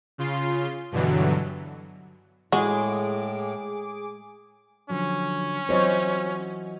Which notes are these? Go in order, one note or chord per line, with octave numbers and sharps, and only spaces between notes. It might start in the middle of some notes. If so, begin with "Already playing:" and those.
C#3 F4 C6
G2 B2 D3 E3 F#3
A2 G#3 F#4 G#4 D6
D3 F3 F#3 C#4
E3 F#3 C4 F4 C5 C#5 D#5